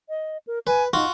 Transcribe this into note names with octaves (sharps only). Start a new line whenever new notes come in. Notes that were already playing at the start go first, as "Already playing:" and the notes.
D#5
A#4
B4 G#5
D#4 F4 F#4